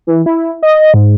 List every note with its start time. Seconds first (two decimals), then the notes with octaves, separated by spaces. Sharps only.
0.07 E3
0.26 E4
0.63 D#5
0.94 G#2